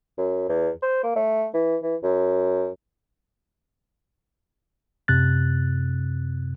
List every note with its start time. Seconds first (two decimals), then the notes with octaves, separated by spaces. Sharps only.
0.18 F#2
0.49 E2
0.82 C5
1.03 A#3
1.16 A3
1.54 E3
1.83 E3
2.03 F#2
5.08 F#2 C3 F#6 A6